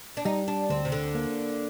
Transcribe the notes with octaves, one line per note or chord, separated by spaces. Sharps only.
D4
G3 D#4
D4
D2 C4
C3
D3
A#3